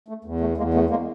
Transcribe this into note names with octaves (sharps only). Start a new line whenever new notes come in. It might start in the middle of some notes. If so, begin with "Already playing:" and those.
A3
E2
A3
E2 G#3 A#3
A3 B3
G#3 A#3